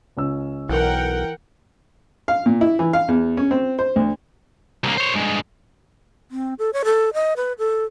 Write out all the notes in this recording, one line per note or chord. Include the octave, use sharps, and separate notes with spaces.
C#2 C#4 E6
B1 E3 A#4 F#5 G5
F5
A#2
E4
E3
F5
E2
C#4
C4
C5
D2
C2 A#3
C5 C#5
G2 G#3
C4
A4
C#5
A4
D#5
B4
A4